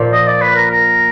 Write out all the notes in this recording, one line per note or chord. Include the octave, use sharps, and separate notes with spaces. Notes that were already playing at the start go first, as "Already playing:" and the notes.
Already playing: A#2 F3 A#3
D#5
D5
B4
A#4
A#4